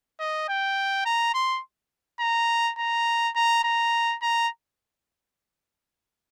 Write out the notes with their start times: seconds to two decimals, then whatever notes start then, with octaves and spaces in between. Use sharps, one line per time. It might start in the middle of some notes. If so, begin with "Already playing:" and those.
0.20 D#5
0.49 G5
1.06 A#5
1.34 C6
2.20 A#5
2.78 A#5
3.36 A#5
3.64 A#5
4.22 A#5